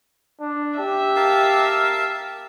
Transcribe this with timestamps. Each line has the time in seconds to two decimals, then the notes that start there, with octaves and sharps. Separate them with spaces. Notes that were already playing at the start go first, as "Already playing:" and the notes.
0.40 D4
0.79 G4 E5
1.16 A#4 F5 A5